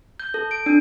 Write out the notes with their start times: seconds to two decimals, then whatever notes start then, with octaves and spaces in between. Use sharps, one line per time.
0.20 G6
0.34 A4
0.51 D7
0.66 D4